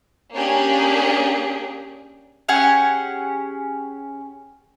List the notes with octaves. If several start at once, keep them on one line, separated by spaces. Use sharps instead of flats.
A#3 C#4 D4 G4 G#4
C#4 G4 G#4 F#5